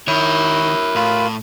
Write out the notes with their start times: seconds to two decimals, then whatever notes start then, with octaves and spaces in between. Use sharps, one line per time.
0.08 D#3 E4 A#4 C#5
0.95 A2 F4 B5